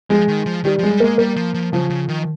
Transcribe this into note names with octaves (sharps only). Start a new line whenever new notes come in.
F3 G#3
D#3
F3
D#3 G3
F3 G#3
G3
G#3 A#3
G3 A#3
F3
F3
C#3 F3
C#3
D#3